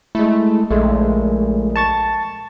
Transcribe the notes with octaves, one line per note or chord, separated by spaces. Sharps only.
G#3 A3 E4
A#1 G#3 A3
A5 C#6 A6